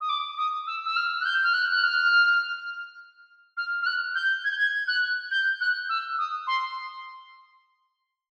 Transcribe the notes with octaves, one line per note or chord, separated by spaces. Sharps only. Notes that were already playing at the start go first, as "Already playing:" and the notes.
D#6
D6
D#6
E6
E6
F6
F#6
G6
F6
F#6
F#6
F6
F6
F6
F#6
G6
G#6
G6
G#6
F#6
G6
F#6
E6
D#6
C6